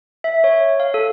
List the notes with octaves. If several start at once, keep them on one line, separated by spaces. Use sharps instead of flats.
E5
C#5
F5
A4